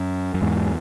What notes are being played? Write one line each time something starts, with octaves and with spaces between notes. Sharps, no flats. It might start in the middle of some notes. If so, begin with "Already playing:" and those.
Already playing: F#2
F#2
E2 G#2